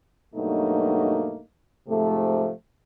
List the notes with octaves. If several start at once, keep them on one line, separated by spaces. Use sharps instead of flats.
G2 B2 F#3 A3 A#3 D#4
G#2 C3 F3 A3